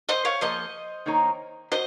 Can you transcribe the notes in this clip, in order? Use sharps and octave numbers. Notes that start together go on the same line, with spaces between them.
C5 D#5
C#5 F5
F3 A#3 F4 G#4 C5 D#5
D#3 A#3 D#4 A#4 C#5
F#4 C5 D#5